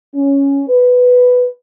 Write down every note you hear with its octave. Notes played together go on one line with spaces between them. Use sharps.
C#4
B4